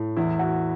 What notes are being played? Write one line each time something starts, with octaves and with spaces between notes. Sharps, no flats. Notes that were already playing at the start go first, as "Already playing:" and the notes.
Already playing: A2
E2 E4
F#4